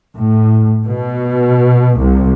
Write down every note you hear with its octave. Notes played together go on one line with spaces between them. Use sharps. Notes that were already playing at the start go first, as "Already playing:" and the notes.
A2
B2
C2